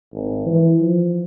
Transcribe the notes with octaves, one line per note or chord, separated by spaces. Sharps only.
G#1
E3
F3